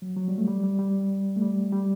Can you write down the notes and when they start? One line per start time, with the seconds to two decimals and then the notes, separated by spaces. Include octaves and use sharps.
0.02 F#3
0.17 F#3
0.28 G3
0.38 A3
0.48 G3
0.64 G3
0.79 G3
1.36 A3
1.42 G3
1.73 G3